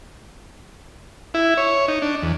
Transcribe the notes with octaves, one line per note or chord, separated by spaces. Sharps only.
E4
C#5
D#4
D4
E2